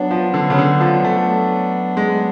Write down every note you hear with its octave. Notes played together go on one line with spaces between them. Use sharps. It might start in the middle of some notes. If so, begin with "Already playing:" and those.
Already playing: F#3 B3 D4
F3
D3
C#3
D3
F3
A3
G#3